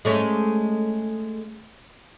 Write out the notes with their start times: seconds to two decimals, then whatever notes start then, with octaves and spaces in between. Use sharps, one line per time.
0.05 G#3 A3 C#4